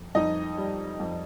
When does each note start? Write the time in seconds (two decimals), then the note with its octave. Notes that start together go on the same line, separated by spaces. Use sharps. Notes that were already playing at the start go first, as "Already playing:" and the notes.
Already playing: F2
0.15 F2 D#4 D#5
0.58 G3
1.00 F2